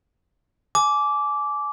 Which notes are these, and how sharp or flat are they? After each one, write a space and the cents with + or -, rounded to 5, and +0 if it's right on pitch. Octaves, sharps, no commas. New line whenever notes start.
G#5 +30 D6 -10